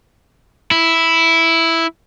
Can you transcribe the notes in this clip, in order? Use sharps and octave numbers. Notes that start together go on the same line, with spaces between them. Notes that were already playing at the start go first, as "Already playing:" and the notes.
E4